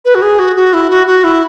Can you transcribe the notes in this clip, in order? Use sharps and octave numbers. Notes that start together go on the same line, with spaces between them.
B4
F#4
G#4
F#4
F#4
E4
F#4
F#4
E4